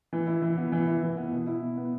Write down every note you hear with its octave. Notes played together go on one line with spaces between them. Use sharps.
E3
E4
E3
B3
E3
E4
E3
B3
B2
E4
B2
B3